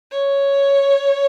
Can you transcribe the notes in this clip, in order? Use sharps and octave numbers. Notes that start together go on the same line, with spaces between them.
C#5